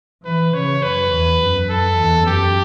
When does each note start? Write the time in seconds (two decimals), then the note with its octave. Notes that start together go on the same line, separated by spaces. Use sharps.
0.25 E3 B4
0.54 C#3 C#5
0.82 F#2 B4
1.12 E2
1.41 F#2
1.69 F#2 A4
1.98 E2
2.26 F#2 G4